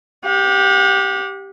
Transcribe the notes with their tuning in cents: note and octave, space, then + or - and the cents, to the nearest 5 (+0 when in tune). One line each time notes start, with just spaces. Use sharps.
G4 +0 F#5 -40